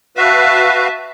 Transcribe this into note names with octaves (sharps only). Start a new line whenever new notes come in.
F#4 B4 E5 F5 A5